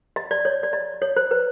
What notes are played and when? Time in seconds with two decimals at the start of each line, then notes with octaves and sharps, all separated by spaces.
0.16 D#5
0.31 D5
0.45 C#5
0.63 D5
0.73 D#5
1.02 C#5
1.17 C5
1.31 B4